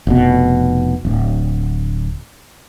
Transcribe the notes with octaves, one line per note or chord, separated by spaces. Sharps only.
F1 B2
D1